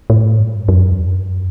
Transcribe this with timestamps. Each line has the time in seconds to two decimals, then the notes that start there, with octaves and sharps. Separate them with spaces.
0.10 A2
0.40 G2
0.68 F#2
0.91 E2
0.98 F#2